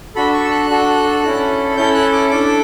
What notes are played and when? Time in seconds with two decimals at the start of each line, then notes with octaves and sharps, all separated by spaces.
0.15 D4 F#4 A4 B5
0.34 C#6
0.45 E6
0.51 F#6
0.70 D4 F#4 A4
1.23 C#4 E4 A4
1.77 C#4 E4 A4 G6
1.94 F#6
2.13 D6
2.30 D4 A4 D6